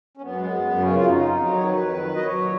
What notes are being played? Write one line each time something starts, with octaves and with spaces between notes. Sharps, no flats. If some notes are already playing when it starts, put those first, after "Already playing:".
C#4
F#2 B3
G#3
F#2
F#2
C#3 C#4
F2 F4
F2 D#4
F2
F#3
D#3 C#5
F2 B4
D#3
F#3
F#3
D#5
F#3 C#5
A#2